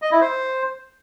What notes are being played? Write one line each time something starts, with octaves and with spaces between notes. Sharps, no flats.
D#5
E4
C5